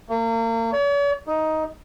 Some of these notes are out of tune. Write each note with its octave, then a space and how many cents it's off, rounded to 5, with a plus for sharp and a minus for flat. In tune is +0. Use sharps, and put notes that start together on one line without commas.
A#3 -35
C#5 +45
D#4 +10